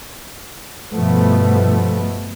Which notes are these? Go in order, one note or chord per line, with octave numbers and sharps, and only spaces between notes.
G2 B2 F3 A3 B3